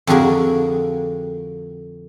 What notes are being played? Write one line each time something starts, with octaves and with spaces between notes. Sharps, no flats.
F2 D3 F#4 G#4 A#4